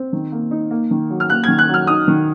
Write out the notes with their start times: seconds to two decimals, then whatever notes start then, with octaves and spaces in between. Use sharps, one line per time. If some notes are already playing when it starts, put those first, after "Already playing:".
Already playing: C4
0.13 D#3
0.32 A#3
0.51 D#4
0.71 A#3
0.91 D#3
1.10 F#3
1.20 F6
1.30 A#3 F#6
1.44 D#3 G#6
1.59 F#6
1.69 F#3 F6
1.87 D#4 D#6
2.08 D#3